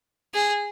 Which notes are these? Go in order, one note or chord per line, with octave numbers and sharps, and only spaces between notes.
G#4